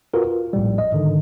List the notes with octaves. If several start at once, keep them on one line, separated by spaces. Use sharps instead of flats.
F4 F#4 A#4 B4
F4
A#1 A2 G3
D#5
G#2 D3 D#3